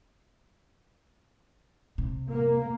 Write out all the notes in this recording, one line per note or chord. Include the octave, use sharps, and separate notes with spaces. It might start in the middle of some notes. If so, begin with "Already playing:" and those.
C3
A#3